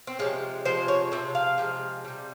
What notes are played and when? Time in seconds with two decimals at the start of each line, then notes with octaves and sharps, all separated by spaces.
0.07 C4
0.19 C3 F3 G#3 C#4
0.65 C3 F3 G#3 C5
0.88 C#5
1.12 C3 F3 E5
1.35 F5
1.58 C3 F3 G#3
2.05 C3 G3